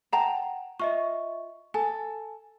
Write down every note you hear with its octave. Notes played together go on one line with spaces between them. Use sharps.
F#5 G5 A5 A#5
F4 D#5 E5 C#6
A4 G#5